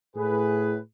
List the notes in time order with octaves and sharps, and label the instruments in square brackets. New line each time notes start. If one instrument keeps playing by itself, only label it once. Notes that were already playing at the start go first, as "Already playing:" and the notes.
[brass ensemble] A2 G#4 B4